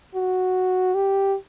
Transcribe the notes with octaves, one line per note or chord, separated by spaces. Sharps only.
F#4
G4